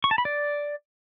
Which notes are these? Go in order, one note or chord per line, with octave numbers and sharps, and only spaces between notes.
C#6
A5
B5
D5